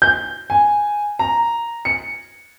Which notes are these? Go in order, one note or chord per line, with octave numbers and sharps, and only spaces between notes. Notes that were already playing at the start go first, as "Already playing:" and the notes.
G6
G#5
A#5
C#7